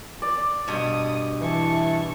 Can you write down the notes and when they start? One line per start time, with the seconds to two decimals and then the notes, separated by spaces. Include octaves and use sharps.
0.22 D5
0.68 G2 B2 D#6
1.41 E3 A5 C#6